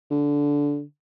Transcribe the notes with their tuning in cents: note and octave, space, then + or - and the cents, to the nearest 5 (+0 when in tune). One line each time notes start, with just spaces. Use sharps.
D3 -15